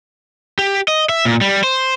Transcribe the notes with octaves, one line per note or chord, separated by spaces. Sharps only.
G4
D#5
E5
A#2
G3
C5